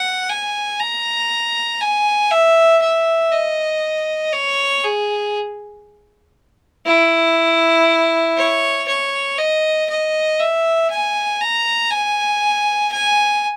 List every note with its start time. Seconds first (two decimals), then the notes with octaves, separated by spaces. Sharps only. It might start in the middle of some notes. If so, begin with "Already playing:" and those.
Already playing: F#5
0.29 G#5
0.80 A#5
1.81 G#5
2.31 E5
2.82 E5
3.32 D#5
4.33 C#5
4.84 G#4
6.86 E4
8.37 C#5
8.87 C#5
9.38 D#5
9.89 D#5
10.39 E5
10.90 G#5
11.40 A#5
11.91 G#5
12.92 G#5